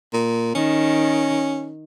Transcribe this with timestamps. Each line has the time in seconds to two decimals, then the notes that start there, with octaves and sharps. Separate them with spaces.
0.13 A#2
0.55 D#3 C#4